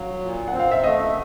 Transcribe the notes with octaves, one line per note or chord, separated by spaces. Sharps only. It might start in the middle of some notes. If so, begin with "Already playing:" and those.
Already playing: F#3 F5
A#2
C4 F#5
F5
E5
A3 D#5